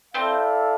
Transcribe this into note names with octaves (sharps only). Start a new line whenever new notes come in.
C4 E4 A4 C5 D5 F5